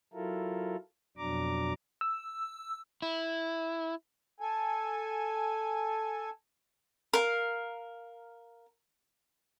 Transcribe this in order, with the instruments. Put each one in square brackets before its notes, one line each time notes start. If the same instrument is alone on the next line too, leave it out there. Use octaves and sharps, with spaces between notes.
[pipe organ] F#3 E4 F4 A4 A#4
F2 B2 F#3 D4 A#5 D6
[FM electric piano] E6
[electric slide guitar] E4
[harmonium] A4 G#5
[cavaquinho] A#4 F5